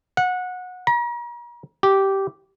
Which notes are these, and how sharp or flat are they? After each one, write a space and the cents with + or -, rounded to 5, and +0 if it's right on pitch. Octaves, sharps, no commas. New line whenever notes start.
F#5 -20
A#5 +40
G4 -10